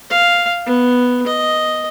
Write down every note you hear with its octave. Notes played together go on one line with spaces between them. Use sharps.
F5
B3
D#5